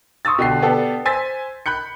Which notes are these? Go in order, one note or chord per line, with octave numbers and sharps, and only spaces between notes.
C6 C#6 D#6 E6 A6
B2 D3 G4 C7
B3 D4 G4 A4
C5 G#5 E6 A6 B6
B5 F#6 G6 C#7